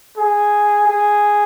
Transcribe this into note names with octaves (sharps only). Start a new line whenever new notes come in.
G#4
G#4